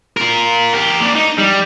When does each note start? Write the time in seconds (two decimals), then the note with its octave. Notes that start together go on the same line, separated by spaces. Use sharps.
0.17 F4 A#4
0.74 G4 A#4
1.00 A#3 D4
1.15 D#4
1.38 G3